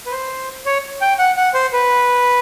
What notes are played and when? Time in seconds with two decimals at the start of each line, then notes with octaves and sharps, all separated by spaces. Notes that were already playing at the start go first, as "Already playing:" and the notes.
0.06 B4
0.11 C5
0.66 C#5
1.01 G5
1.19 F#5
1.37 F#5
1.54 C5
1.73 B4